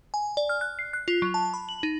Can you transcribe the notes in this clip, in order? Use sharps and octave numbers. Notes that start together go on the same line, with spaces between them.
G#5
D5
F6
F#6
C7
F#6
F4
F#3
A5
B5
F#7
D#4